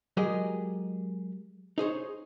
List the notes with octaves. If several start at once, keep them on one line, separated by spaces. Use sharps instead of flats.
F#3 G#3 G4 G#4 A#4 D#5
D#4 G#4 C5 C#5